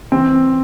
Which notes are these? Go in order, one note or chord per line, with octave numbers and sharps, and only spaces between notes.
E3 C4